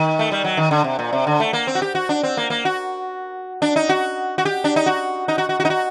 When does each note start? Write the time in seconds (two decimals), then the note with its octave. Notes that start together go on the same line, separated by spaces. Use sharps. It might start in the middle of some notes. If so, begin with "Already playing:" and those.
Already playing: D#3
0.19 A3
0.32 G3
0.44 F#3
0.57 D#3
0.71 D3
0.84 C3
0.99 A#2
1.13 C3
1.27 D3
1.40 A3
1.53 A#3
1.67 C4
1.75 F#4
1.82 G4
1.95 F#4
2.09 D4
2.23 C4
2.37 A#3
2.50 A#3
2.65 F#4
3.62 D4
3.76 D#4
3.89 F#4
4.38 F#4
4.45 G4
4.64 D4
4.76 D#4
4.86 F#4
5.28 D#4
5.38 F#4
5.49 F#4
5.60 F#4
5.65 D#4
5.70 F#4